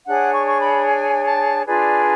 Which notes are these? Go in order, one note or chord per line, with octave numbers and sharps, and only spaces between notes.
D4 G#4 C#5 F#5
C#6
C#6
B5
G#5
A5
D4 F4 G#4 B4 D5